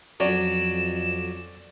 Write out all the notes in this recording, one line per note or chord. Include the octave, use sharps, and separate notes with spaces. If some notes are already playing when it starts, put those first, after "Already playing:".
F2 F#3 C#4 D5 E7